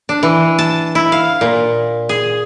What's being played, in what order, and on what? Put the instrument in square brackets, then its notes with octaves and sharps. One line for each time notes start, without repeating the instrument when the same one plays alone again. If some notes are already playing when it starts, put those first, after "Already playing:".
[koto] D4
E3
A5
E4
F5
A#2
G#4